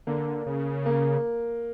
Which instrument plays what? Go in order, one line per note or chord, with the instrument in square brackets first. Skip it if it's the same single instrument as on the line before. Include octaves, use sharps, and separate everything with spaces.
[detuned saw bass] D3 [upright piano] A#3
[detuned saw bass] C#3
[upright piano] A#3